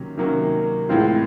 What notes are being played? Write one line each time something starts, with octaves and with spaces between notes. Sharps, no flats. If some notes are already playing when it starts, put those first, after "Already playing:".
Already playing: C3 D#3 F#3 A#3 C#4
C3 D#3 F#3 A#3 C#4
A2 E3 G#3 C4 F4